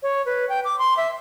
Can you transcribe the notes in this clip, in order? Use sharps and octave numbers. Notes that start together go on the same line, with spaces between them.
C#5
B4
G5
D6
C6
E5